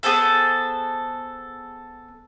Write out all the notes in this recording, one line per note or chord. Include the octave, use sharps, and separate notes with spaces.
B3 G#4 A4 C5